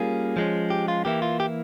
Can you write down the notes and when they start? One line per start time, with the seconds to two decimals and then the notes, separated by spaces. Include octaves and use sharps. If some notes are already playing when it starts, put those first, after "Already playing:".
Already playing: G3 A#3 C#4 F4 G#4
0.37 F3 G#3 C#4
0.70 G4
0.88 F4
1.05 E3 A#3 E4 G4
1.22 F4
1.40 G4